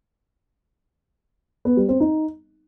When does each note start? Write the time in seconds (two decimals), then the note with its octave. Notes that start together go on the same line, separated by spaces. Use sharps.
1.65 B3
1.77 G3
1.89 C4
2.00 D#4